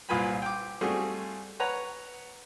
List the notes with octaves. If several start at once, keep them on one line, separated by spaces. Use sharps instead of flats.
C2 A#2 F4 B4 G#5 B5
G5 D6
G3 A3 C4 F4 F#4 G#4
B4 C#5 F#5 A#5